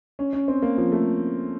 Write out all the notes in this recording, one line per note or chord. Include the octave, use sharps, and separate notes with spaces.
C#4
C#4
C4
A#3
F3
A3